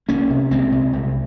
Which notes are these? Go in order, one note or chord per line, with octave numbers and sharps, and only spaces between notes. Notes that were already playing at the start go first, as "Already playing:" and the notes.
C2 A#3 C#4
C3
C2 G#3 C4
C3
C2